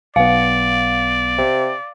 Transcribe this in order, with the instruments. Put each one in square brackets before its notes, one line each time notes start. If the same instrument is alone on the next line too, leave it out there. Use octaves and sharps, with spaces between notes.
[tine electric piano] B1 B3 [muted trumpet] D5 [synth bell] F5
[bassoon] C3